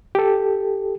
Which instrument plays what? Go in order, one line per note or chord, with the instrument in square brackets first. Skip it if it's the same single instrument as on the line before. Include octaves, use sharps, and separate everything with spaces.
[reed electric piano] G4 A4